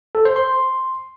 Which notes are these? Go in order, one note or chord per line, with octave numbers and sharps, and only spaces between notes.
A4
C5
C6